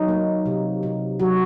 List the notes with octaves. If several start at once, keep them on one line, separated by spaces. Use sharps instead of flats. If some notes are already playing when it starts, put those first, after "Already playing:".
Already playing: F#3 D#4
A#3
C3
C3
F#3 F#4